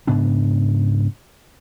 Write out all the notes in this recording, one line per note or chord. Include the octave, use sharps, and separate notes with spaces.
G#2 C#3 B3 D4